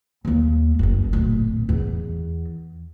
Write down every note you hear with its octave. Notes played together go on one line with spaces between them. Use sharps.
D#2 A#3
F#1 C#2
D1 A#1
E2